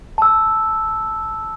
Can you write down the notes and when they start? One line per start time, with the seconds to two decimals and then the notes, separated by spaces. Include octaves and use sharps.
0.18 A5 E6